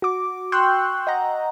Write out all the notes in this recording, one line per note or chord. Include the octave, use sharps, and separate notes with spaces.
F#4 D6
G5 C6 C#6 E6 F#6 G6
D#5 F#5 A#5